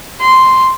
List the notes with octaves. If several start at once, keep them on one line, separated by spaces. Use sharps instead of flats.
C6